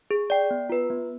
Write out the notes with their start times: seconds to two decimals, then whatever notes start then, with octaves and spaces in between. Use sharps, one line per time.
0.11 G#4
0.30 D5 G5
0.51 B3
0.69 F4 B4
0.90 B3